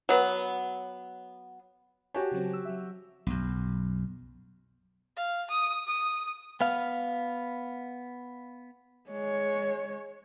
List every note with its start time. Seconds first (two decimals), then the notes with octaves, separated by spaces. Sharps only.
0.09 F#3 B3
2.14 F#4 G4 C#5 G#5 A5
2.32 C#3 F#3 C4
2.53 E6
2.65 F#3 E5
3.27 B1 F#2
5.17 F5
5.51 D#6
5.87 D#6
6.61 B3 F5
9.11 G#3 C#5